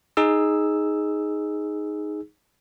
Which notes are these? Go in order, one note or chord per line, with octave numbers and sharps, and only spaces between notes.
D#4 G#4 E6